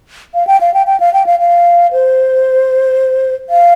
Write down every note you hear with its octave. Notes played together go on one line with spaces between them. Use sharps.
F5
G5
F5
G5
G5
F5
G5
F5
F5
C5
F5